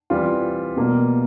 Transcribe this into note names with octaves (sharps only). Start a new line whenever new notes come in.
E3 G3 C4 F4
B2 G3 A#3